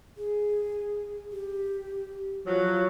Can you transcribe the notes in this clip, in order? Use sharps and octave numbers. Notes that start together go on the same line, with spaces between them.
G#4
G4
F3 F#3